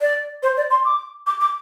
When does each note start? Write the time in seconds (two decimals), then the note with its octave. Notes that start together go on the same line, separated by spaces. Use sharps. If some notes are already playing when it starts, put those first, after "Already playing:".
0.01 D5
0.43 C5
0.57 D5
0.70 C6
0.85 D6
1.27 D6
1.41 D6